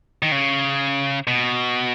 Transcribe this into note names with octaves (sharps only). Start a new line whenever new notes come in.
D#3
C#3
B2